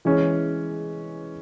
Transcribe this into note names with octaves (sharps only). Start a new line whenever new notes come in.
E3 G#3 C#4